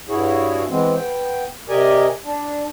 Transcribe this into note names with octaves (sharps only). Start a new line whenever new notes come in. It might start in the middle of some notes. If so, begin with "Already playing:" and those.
G2 E4 F#4 G#4 C#5
E3 G#3 B3 C4
B3 G5
C3 G4 A#4 D5 D#5 G#5
D4